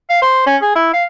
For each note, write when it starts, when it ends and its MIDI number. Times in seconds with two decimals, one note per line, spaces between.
0.10 0.18 77
0.22 0.43 72
0.47 0.57 61
0.62 0.73 68
0.76 0.91 64
0.93 1.04 77